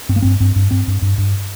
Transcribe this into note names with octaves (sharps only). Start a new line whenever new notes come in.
G2 C4
A#3
G2 C4
G2 C4
G2
G2 C4
G2
G2
G2